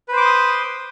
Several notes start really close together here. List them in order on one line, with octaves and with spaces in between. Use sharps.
B4 C5 D6 C6 D#6